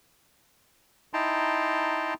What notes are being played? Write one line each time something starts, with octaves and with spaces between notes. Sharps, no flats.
D#4 E4 G5 A5 A#5 C6